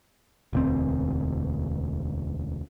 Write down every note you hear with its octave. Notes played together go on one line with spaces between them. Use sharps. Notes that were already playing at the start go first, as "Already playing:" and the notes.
E1 D2 C4